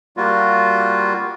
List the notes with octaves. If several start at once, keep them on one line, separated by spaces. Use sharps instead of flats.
G3 A#3 F4 F#4